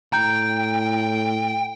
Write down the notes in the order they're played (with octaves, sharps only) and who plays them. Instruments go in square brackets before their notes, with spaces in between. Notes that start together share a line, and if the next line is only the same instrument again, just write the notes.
[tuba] A2 [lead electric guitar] G5 [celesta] A#5 G6